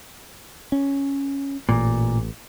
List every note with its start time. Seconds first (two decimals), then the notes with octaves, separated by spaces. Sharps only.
0.72 C#4
1.69 A1 A#2